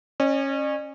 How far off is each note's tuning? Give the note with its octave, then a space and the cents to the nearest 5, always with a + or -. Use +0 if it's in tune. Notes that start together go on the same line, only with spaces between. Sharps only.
C#4 -20 D5 +45